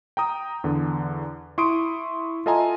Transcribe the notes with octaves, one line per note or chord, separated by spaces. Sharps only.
G5 A#5 D#6
E2 D3
E4 C6 C#6 D#6 D7
F4 A4 D#5 E5 G#5 A#5